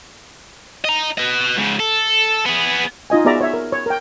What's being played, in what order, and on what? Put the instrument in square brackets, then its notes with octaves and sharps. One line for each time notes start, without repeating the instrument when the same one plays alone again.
[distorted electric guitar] D#5 A#5
B4 D#5
G#2 C#3
A4
B3 G#4
[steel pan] D#4 F4 D#5 G#5
B3 F#4 G#4 D5 E5 A#5
C#5 E5
A#4
C#5
A#4 G5